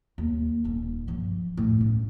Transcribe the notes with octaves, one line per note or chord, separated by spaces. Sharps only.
D#2
D#1 D#4
G2 F3
A2
C#4